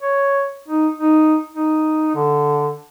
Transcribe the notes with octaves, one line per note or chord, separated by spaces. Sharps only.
C#5
D#4
D#4
D#4
D3